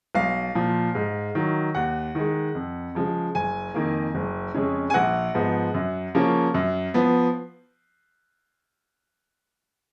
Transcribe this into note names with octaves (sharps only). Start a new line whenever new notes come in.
B1 F5
A#2 F3
G#2
D#3 F#3
D#2 F#5
D#3 G#3
F2
C#3 F3 G#3
F#1 G#5
F2 D#3 A#3
F#1
F2 C#3 G#3 C#4
G#5
A#1 F#5
G#2 F3 B3
F#2
C#3 F3 A#3 C#4
F#2
F3 B3